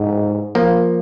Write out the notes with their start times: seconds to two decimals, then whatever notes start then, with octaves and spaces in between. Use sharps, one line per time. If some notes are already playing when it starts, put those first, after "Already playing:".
Already playing: G#2
0.55 F3 A#3